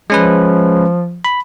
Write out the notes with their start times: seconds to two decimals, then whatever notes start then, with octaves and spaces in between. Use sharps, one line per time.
0.10 F3 G#3 C#4 B4
1.25 B5